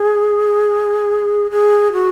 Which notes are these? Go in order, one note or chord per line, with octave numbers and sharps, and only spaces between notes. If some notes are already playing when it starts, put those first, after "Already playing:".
Already playing: G#4
G#4
F#4